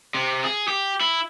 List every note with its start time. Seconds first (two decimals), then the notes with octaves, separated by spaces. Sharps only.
0.14 C3
0.44 G#4
0.68 G4
1.00 E4